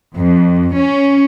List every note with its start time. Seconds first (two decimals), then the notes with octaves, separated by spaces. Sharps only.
0.14 F2
0.77 C#4